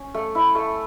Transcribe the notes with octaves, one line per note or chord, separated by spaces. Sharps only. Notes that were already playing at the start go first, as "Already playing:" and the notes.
Already playing: C#4
A3
E4
A3